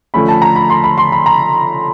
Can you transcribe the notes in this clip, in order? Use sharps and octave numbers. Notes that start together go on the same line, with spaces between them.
D3 F3 A3 C#4 B5
A5
A#5
B5
C6
B5
C6
B5
A#5